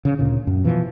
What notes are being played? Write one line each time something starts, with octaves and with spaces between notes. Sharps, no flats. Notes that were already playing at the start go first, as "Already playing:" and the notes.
C#3
D2 A#2 C#3
F#2
B2 E3 F3